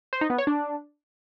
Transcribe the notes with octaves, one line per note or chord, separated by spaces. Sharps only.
C5
D#4
B3
C#5
D4